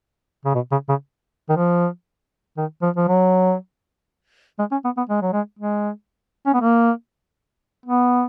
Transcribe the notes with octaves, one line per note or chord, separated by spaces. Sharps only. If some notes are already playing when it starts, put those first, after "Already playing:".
C#3
B2
C#3
C#3
D#3
F3
D#3
F3
F3
F#3
G#3
C#4
B3
B3
G#3
F#3
G#3
G#3
C#4
B3
A#3
B3